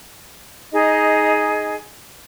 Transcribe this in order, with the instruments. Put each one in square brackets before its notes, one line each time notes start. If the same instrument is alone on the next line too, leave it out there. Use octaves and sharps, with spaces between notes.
[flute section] D#4 G#4 D#5